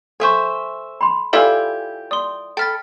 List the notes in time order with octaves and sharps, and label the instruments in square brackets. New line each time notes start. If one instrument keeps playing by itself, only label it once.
[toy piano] A4 C#6 [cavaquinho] C5 E5 G#5
[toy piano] B5 C6
[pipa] E3 F4 E5 [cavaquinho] G4 G#5 [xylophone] A4 D5
[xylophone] D5 C6 [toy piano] D#6
[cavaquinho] A4 B5 [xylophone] G5 F6 A6